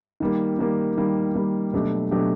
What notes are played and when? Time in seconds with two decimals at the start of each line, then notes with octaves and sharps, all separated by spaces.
0.20 D#3 G3 A#3
0.59 D#3 G3 A#3
0.97 D#3 G3 A#3
1.35 D#3 G3 A#3
1.73 B2 F#3 A3 D4 G4
2.11 B2 F#3 A3 D4 G4